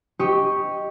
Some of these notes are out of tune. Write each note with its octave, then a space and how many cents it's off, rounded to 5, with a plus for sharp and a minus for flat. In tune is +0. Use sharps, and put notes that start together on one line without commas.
G4 +0 D#5 +0 C#6 +0